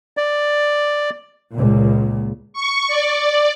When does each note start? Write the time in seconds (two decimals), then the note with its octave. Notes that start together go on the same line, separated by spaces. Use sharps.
0.17 D5
1.52 C#2 A#2
2.53 C#6
2.88 D5